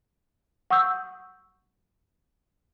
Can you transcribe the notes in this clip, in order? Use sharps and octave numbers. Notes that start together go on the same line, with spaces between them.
F#5 C#6 D#6 E6 G6